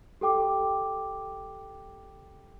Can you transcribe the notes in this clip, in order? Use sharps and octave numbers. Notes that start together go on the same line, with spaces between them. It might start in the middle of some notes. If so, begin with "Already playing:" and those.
G4 A4 G5 D6